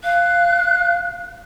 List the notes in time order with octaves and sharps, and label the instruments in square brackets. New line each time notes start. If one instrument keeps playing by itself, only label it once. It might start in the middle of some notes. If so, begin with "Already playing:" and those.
[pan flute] F5 [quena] F#6